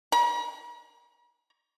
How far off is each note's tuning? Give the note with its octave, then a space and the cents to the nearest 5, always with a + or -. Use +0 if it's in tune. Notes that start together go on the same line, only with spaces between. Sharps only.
A#5 +45